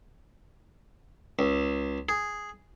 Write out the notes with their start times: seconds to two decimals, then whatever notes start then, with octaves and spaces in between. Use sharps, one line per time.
1.39 C#2
2.09 G#4